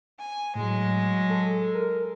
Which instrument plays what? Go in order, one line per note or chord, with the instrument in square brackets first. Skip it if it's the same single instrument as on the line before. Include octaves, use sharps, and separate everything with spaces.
[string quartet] G#5
[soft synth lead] A2 [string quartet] F#3 G#3
[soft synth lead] A4
A#4